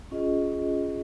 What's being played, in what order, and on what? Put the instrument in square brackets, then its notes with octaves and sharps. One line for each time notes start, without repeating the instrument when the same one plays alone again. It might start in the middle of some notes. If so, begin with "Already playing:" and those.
[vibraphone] C#4 F4 G#4 D#5